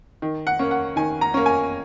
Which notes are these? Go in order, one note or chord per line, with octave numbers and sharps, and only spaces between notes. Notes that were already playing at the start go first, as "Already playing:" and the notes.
D#3
F#5
A#3 C#4
F#5
D#3 G#5
A#5
A#3 C#4
G#5